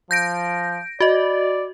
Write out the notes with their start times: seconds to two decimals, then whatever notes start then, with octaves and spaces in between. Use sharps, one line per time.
0.11 F3 G6 A#6 D7
1.00 F#4 D5 D#5